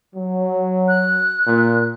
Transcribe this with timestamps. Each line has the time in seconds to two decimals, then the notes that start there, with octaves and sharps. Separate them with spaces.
0.15 F#3
0.88 F#6
1.47 A#2